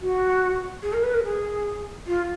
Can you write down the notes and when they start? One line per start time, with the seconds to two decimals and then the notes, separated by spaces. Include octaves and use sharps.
0.01 F#4
0.82 G#4
0.93 A#4
1.03 B4
1.13 A#4
1.24 G#4
2.07 F4